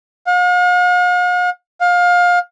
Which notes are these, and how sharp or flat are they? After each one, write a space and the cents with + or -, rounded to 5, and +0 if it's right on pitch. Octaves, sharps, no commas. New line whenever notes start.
F5 +45
F5 +25